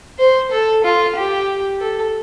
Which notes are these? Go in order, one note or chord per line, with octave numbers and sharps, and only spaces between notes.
C5
A4
F4
G4
A4